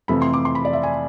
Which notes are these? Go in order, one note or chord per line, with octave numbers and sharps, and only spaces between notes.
F2 C3 E3 A3 B5
C6
D6
C6
B5
D5
E5
G#5